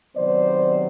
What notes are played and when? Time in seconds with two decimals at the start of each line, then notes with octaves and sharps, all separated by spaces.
0.15 C3 D#3 F#3 B3 C5 D5